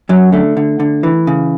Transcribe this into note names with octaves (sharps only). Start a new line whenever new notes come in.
F#2 F#3
D3 A3
D3
D3
E3
C#3